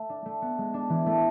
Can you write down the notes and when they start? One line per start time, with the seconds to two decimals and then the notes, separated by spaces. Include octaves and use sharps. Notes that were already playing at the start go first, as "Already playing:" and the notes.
Already playing: A3
0.09 D4
0.26 A3
0.42 B3
0.58 G#3
0.74 D4
0.89 E3
1.06 A3